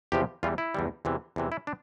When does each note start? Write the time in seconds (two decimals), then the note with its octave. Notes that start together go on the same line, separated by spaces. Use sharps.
0.12 E2 C3 F3 G4
0.43 E2 E3 G3 F4
0.58 E4
0.74 E2 E3 G3
1.05 E2 C3 E3
1.36 E2 C3 E3
1.52 E4
1.67 D4